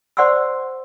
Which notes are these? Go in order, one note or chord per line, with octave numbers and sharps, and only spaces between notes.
C5 D5 F#5 C6 C#6 E6